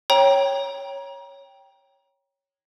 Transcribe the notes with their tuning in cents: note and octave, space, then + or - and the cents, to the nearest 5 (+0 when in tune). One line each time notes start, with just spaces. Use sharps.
C#5 +0 G5 +0 A#5 +30